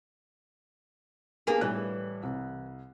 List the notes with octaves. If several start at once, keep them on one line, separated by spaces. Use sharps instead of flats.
A#3 B3 D4 G4 G#4
A2 E3 G3 F#6
C2